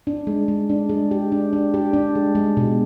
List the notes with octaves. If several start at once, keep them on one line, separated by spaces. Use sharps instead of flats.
D4
G#3
G#3
D4
G#3
G4
D4
D4
G4
D4
G#3
G#3
B2